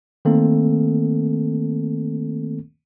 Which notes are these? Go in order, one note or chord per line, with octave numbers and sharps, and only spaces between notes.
D#3 A3 A#3 C4 A4